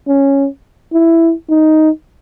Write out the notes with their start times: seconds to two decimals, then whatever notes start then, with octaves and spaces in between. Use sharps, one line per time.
0.08 C#4
0.93 E4
1.50 D#4